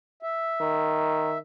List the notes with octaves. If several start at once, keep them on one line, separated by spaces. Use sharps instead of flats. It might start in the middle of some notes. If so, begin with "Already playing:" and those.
E5
D#3